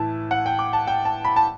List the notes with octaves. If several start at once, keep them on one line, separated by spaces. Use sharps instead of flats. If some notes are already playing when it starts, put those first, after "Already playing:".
Already playing: A2 E3 A5
F#5
G5
D6
A5
G5
A5
B5
A5